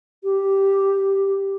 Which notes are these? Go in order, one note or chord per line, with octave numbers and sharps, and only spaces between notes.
G4